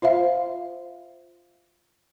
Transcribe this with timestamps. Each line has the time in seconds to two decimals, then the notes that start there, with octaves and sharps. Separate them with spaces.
0.02 F4 C5 E5 F5